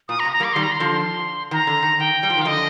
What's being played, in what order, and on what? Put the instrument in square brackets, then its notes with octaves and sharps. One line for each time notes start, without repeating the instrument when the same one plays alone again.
[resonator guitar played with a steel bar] A#2 [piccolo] D#6
[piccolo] A#5
[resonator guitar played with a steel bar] C3
[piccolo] A#5
[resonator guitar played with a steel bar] G3 A#3
[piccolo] D6
[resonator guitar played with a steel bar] D#3 G3 [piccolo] C6
[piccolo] A#5
C6
[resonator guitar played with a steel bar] D3 F3
[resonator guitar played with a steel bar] D#3 [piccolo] A#5
[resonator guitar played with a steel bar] D3
D#3
[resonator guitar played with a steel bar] D#3 [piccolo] G5
[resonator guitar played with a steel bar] G3
F3
D#3
[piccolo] F5
[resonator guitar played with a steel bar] D3 F3 [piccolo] D#5